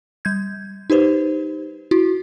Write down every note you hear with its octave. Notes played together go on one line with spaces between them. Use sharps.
G3 G6 G#6
D#4 G4 B4 C5
E4 F#4